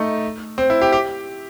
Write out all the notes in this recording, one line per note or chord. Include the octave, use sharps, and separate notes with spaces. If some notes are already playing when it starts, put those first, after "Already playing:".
Already playing: A3 D#4
C4
E4
G4
G4